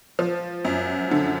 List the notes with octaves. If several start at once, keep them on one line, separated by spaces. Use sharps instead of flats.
F3
F#2
D3